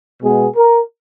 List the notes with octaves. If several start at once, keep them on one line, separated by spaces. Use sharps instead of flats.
B2 G#3 B3 G#4
A#4